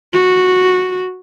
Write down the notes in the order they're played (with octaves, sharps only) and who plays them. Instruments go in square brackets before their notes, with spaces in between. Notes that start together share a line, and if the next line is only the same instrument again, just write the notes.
[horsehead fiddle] F#4